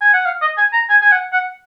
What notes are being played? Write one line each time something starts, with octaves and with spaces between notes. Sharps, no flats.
G#5
F#5
F5
D#5
G#5
A#5
G#5
G#5
F#5
F#5